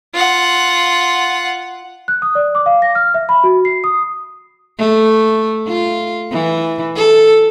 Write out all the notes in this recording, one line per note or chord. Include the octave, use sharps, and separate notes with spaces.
F4 F#5
F#6
D#6
D5
D6
F5
A#6
F6
E5
B5
F#4
C7
D#6
A3
F4
E3
A4